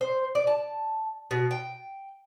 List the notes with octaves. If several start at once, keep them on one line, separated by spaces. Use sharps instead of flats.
C5
D5
A5
B2
G5